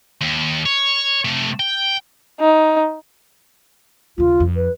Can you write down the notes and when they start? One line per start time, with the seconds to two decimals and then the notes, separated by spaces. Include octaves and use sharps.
0.21 D#2
0.65 C#5
1.25 C3 A3
1.60 G5
2.40 D#4
4.18 D#2 C#3 F4
4.40 F2
4.56 B4